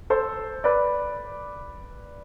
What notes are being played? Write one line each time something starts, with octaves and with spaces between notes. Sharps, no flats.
A4 C5
B4 D5